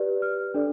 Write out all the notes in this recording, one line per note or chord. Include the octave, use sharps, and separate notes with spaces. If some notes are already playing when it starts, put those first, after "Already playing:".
Already playing: G4 B4 D5
F6
D4 A4 D5